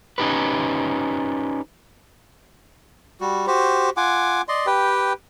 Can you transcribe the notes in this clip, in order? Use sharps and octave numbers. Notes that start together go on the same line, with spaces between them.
C#4 D#4 G4 B4
G3 F#4
F#4 G4 C5
F4 F#5 G#5 D6
D5 D#5 C6
G4 B4 G5